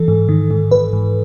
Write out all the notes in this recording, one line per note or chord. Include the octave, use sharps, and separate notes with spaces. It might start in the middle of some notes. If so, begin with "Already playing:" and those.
Already playing: E3 A4
G#2
D#3
G#2
G#2 B4
G#2